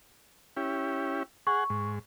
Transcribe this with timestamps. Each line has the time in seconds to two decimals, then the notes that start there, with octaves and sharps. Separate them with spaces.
0.57 C#4 E4 G4
1.47 G#4 F#5 C#6
1.70 G#2